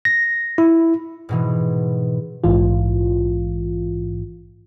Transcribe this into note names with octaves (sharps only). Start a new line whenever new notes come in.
A#6
E4
G#2 B2 E3
A#1 G#2 E3 F4